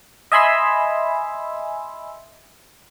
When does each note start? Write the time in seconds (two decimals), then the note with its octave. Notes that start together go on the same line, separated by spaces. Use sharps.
0.32 D#5 E5 G#5 B5 C6 E6